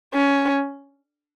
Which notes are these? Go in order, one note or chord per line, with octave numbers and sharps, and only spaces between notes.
C#4